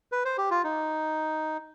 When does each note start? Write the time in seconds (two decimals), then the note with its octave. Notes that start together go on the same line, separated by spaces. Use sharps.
0.12 B4
0.25 C5
0.38 G4
0.51 F4
0.64 D#4